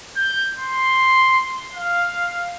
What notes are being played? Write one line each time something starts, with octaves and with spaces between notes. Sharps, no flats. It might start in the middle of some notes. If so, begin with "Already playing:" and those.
G6
C6
F5